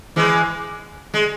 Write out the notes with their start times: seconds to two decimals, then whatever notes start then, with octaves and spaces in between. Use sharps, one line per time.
0.16 E3 G#3
1.14 G#3